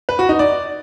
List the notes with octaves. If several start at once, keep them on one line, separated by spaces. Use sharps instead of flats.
B4
F#4
D#4
D5